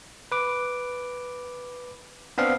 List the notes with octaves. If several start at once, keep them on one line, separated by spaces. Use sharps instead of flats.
B4 D6
B3 C4 D4 F5